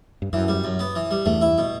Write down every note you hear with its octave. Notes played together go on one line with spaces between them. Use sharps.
G2
F#2 E3
G3
F#2
B3
E3
G3
E2 G2 A3
E4
B2